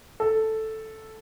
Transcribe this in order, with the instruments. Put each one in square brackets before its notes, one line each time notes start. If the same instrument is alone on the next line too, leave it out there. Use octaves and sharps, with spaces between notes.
[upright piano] A4